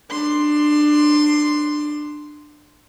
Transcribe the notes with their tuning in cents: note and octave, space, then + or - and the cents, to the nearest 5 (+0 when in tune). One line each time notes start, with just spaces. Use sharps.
D4 +20 C6 +0